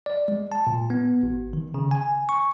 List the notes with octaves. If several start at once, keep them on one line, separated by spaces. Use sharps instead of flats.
D5
G#3
A5
A#2
B3
G#1
D#3
C#3
G#5
C#6